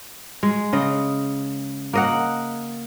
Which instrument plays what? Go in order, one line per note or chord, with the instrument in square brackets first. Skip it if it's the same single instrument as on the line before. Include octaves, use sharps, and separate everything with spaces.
[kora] G#3
C#3 D#5
A#3 D#5 F#5